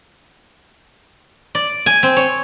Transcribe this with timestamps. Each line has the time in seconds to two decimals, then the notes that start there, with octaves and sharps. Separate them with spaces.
1.55 D5
1.86 G#5
2.03 C4
2.17 C#5